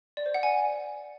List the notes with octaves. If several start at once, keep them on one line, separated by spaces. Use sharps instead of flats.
D5
C5
F#5
G#5